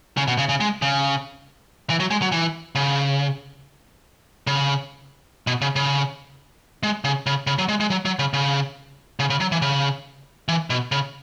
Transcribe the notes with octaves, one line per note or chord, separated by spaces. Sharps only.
C#3
B2
C#3
C#3
G#3
C#3
E3
F#3
G#3
F#3
E3
C#3
C#3
B2
C#3
C#3
G#3
C#3
C#3
C#3
F#3
G#3
G#3
F#3
F#3
C#3
C#3
C#3
C#3
F#3
E3
C#3
E3
B2
C#3